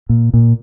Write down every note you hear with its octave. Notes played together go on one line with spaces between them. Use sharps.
A#2
A#2